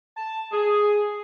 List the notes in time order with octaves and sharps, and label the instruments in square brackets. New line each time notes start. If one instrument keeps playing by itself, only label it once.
[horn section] A5
G#4